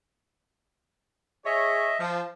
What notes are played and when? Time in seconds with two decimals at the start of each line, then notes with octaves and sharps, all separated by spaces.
1.46 G#4 C#5 D#5 E5
2.00 F3 A5